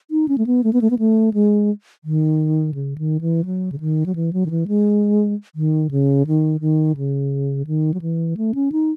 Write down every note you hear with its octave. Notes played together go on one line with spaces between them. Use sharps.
D#4
C#4
A3
B3
A3
B3
A3
B3
A3
G#3
D#3
C#3
D#3
E3
F#3
C#3
D#3
F#3
E3
F#3
D#3
E3
G#3
D#3
C#3
D#3
D#3
C#3
D#3
F#3
E3
A3
C#4
D#4